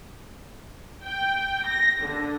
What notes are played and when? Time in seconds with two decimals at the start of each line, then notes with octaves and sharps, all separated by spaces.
1.04 G5
1.67 A#6
2.02 D3